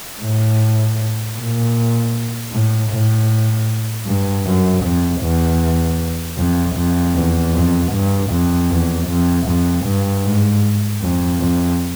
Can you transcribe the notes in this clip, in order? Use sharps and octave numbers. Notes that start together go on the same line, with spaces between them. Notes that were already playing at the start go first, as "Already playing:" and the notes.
A2
A#2
A2
A2
G2
F#2
F2
E2
F2
F2
E2
F2
G2
F2
E2
F2
F2
G2
G#2
F2
F2